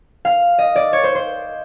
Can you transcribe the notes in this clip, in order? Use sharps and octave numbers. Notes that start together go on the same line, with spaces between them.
F5
D#5
D5
C#5
C5
C5